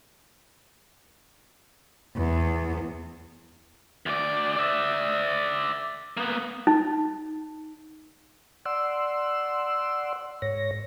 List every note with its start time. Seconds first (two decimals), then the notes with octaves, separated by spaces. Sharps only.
2.17 E2
4.06 D2 D5
4.56 D5 E5
6.17 A#3 B3
6.67 D#4
8.66 D5 F#5 C6 E6
10.42 G#2 C#5 A#6